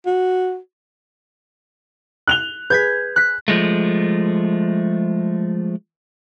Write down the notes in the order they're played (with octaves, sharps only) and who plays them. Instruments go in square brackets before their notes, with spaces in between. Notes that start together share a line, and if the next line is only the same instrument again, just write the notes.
[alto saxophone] F#4
[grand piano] F#6 F7 G7
[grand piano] G#4 B4 [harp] G6 G#6 B6
[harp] F#6 B6
[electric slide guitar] F3 G#3 A3